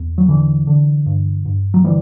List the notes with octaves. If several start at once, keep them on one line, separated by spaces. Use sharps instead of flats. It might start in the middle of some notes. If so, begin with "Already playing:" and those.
Already playing: E2
F#3
D3 E3
D3
G2
G2
F#3
D3 E3 G3